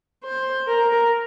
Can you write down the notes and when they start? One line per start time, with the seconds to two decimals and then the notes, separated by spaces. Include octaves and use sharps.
0.24 C5
0.67 A#4